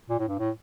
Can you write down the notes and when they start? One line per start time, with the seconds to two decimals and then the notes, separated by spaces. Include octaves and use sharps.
0.10 A#2
0.19 A2
0.28 G2
0.39 A2